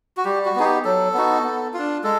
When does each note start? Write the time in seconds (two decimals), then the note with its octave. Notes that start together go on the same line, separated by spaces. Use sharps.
0.17 F#4
0.25 G3 G4
0.45 F#4
0.56 B3 D#4 G#4
0.65 G4
0.85 F#3 A4
1.14 B3 D#4 F#4
1.44 B3
1.74 F4
1.79 D4
2.04 G#3 A4